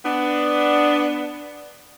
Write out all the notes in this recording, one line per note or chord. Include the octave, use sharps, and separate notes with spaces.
B3 D4